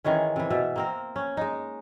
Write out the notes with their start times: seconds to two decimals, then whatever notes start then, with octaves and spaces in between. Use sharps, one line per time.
0.04 D#3 E3 G#3 C#4
0.36 C3 E3
0.50 B2 E5
0.76 A#3 C4 A#4
1.16 C#4
1.37 G#3 D#4